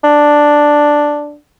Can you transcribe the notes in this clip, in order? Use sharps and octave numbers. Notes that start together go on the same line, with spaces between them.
D4